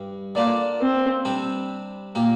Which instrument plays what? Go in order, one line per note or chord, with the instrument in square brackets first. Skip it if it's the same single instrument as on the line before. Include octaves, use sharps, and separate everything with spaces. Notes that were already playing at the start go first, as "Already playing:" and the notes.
Already playing: [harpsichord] G2 G3
[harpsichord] D3 A#3 D4 F4 [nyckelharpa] D5
[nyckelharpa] C4
[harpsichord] C3 G3 D4 G4
A#2 A#3 G4